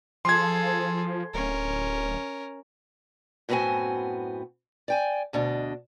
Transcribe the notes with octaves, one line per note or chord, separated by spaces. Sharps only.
F3 G#4 A4 C6 G#6
D1 C#4 A#4
F#2 A2 B3 C4 F#4 G#5
D5 G5 G#5
D2 B2 D4 D#5